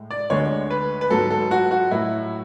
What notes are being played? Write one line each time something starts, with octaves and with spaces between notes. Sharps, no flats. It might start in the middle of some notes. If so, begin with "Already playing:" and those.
Already playing: A2 G#3
D5
D2 D3 G#3 C#5
B4
B4
G#2 F#3 A4
A4
F#4
F#4
A2 F#3 E4